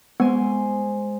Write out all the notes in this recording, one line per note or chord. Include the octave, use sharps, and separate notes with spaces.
G#3 B3 C5 G#5